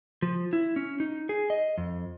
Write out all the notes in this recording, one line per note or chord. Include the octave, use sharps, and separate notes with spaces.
F3
E4
C#4
D#4
G#4
D#5
F2